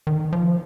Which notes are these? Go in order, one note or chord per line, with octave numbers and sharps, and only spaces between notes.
D#3
F3